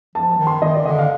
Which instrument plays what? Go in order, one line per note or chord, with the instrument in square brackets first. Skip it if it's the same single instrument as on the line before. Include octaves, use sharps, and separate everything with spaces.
[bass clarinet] F3 [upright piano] A5
[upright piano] A5
[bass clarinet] D#3
[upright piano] C6
[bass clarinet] D#3 [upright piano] D#5
[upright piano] D5
[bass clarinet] D3 [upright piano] D#5
[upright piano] F5